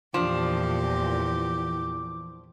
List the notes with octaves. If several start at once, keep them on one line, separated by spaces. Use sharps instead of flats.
E2 A#2 E3 F3 D4 G4 D6